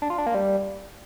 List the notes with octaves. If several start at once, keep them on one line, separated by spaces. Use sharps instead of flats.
D4
F4
D4
A#3
G3